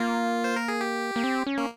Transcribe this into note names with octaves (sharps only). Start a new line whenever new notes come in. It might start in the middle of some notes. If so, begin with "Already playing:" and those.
Already playing: A#3 F4
C5
A#4
G#4
G4
A#3
C4
C#4
A#3